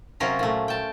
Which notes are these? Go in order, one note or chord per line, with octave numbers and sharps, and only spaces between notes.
C3 F#3 C#4 F4 A#4
A#2 A3
G5 A5